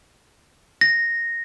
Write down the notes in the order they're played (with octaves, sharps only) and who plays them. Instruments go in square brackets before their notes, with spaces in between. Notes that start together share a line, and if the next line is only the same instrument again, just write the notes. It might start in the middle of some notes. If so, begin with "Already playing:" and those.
[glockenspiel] A#6